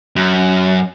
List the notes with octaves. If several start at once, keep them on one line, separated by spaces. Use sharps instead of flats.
F#2